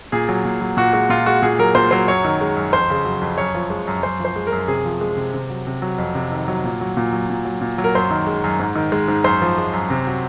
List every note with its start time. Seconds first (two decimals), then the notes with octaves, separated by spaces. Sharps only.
0.12 A#2 G#4
0.29 F#3
0.45 A#2
0.61 F#3
0.77 A#2 F#4
0.93 G#3 F#4
1.09 A#2 F4
1.26 G#3 F#4
1.42 A#2 G#4
1.59 F#3 A#4
1.75 A#2 C5
1.91 F#3 C5
2.08 F#2 C#5
2.25 D#3
2.41 G#3
2.57 F#2
2.73 F2 C5
2.90 C#3
3.05 F#3
3.21 F2
3.38 F#2 C#5
3.55 F3
3.70 G#3
3.87 F#2
4.03 F#2 C5
4.20 F3 C5
4.36 G#3
4.47 A#4
4.52 F#2
4.68 C3 G#4
4.85 F3
5.01 G#3
5.17 C3
5.34 C3
5.50 F#3
5.67 C3
5.82 F#3
5.98 F2
6.15 C3
6.32 D#3
6.48 F#3
6.64 A#2
6.81 F#3
6.97 A#2
7.12 F#3
7.30 A#2
7.45 F#3
7.61 A#2
7.78 F#3
7.84 A#4
7.95 F#2 C5
8.11 D#3
8.27 G#3
8.44 F#2
8.60 G#2
8.76 D#3
8.92 G#3
9.08 G#2
9.24 F#2 C5
9.42 F3
9.58 G#3
9.73 F#2
9.90 C3
10.07 F#3